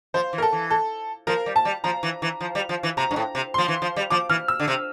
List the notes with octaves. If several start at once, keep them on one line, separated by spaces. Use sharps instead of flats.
F3 C5
E3
A#4
A4
E3
A4
F3 A#4
G3
A5
G3
F3 A#5
E3
E3
F3
G3
F3
E3
C3 A#5
G2
A2
C3
F3 C6
E3
F3
G3
F3 D6
E3 F6
E6
D3
C3